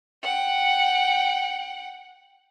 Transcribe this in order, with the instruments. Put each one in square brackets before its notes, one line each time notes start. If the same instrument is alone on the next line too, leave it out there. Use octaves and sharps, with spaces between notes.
[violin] F#5 G5